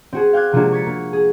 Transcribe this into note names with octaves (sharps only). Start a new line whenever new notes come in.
C4 F#4 G#4
F5 G5 D6 F#6 G#6
C3 F3 G#3 A#3 D4 F#4
C#6 G#6 A6 B6 C#7
A#3
G#4